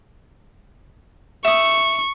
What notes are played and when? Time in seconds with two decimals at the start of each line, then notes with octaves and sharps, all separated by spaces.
1.45 E5 C#6 D#6